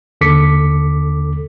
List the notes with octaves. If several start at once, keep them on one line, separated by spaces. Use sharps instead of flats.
D#2 D3 A4 D6 B6 C#7